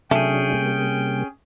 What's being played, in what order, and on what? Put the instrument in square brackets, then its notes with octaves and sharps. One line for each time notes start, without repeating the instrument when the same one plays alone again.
[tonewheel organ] C3 F#3 D4 [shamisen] A3 [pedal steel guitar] C#4 G#4 [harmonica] G5
[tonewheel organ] C3 G3 A#3